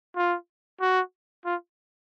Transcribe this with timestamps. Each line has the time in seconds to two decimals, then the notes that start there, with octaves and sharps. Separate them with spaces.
0.16 F4
0.81 F#4
1.46 F4